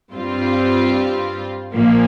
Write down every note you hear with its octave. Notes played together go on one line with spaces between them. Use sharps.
G2 G3 C4 F4
A#2 F3 A#3